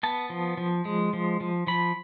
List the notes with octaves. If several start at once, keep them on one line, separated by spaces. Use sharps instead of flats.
B3 A5
F3
F3
G#3
F3
F3
F3 B5